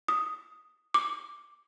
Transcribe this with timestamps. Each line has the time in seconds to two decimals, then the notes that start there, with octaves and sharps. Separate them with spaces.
0.08 D#6
0.94 D6